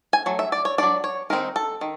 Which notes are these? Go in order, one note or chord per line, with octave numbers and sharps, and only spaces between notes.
G#5
F#3 A3
E5
D5
C#5
F#3 A3 D4 D5
C#5
D#3 G#3 C4 D#4 A#4
A4
D#3